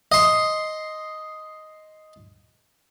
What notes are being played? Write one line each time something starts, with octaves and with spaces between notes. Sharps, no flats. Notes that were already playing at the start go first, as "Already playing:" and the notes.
D#5 C6